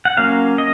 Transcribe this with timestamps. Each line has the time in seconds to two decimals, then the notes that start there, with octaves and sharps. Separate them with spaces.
0.05 F#5
0.17 F#3 A#3 C#4 F5
0.58 D#5